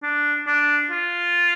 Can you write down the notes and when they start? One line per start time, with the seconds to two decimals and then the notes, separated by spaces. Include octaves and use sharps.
0.03 D4
0.47 D4
0.91 F4